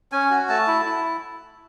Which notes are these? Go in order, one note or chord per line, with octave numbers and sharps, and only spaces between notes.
C#4 G#5
F#4
A3 A5
E4
E4